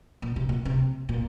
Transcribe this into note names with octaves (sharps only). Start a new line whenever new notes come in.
A#2
C3
A#2
C3
A#2